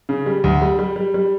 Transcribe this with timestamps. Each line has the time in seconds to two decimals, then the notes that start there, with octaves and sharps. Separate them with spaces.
0.09 C#3
0.26 G3
0.44 D2
0.62 G3
0.79 G3
0.96 G3
1.14 G3